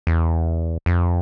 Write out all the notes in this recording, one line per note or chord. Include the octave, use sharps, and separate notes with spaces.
E2
F2